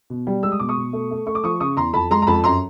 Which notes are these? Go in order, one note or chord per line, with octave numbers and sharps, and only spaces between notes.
B2
G3
G#3 E6
D#6
B2 D6
C#6 D#6
B2
A3
A3
A3 C#6
D6
F3 C#6 D#6
C#3 C#6 D#6
E2 A#5 C6
F2 A5 B5
G#3 A#5 C6
A#5
F2 A5 B5
F#2 A#5 C6